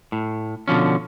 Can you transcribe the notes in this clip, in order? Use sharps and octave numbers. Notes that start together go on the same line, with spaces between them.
A2
B2 D3 F3 C#4